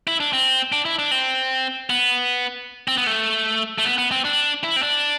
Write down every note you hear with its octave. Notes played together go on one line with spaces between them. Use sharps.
E4
D4
C4
D4
E4
D4
C4
B3
C4
B3
A3
A3
B3
B3
C4
D4
E4
C4
D4